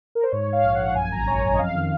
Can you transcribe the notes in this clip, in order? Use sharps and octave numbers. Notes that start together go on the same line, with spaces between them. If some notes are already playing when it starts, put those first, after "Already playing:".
A#4
C5
G#2 C#5
G#2
F5
A#1
A#1 F#5
F#2 G#5
G#1 A#5
F#2 C#5
F#2 C#5
D#5
F2 F5
D#3